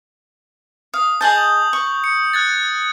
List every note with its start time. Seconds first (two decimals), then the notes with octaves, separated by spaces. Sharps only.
0.94 F5 D#6
1.21 G#4 D#5 A5 G6 F#7
1.73 C#6
2.04 C#7
2.33 F#6 G#6 A6